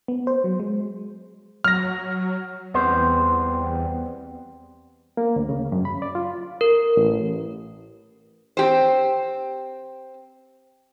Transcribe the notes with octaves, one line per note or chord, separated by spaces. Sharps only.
B3
C5
F#3
G#3
F#3 F6 A#6
E2 G3 B3 C4 C5
A#3
D2
C#3
F#2
B5
D5
F4
A#4
A1
C4 G4 C5